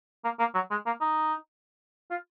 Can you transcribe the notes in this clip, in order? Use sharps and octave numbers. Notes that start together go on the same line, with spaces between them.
A#3
A#3
F#3
G#3
A#3
D#4
F4